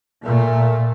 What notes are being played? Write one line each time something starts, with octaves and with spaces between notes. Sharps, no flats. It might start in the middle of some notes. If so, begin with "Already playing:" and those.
A#2 A3